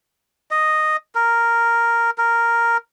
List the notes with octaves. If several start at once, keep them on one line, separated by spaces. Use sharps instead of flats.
D#5
A#4
A#4